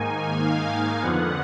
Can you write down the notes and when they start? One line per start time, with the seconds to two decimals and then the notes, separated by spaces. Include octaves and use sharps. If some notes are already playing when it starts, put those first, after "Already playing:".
Already playing: G#2 D#3 A#3 D#4 G#5
0.43 F5
1.02 F2 D3 F3 B3 F#5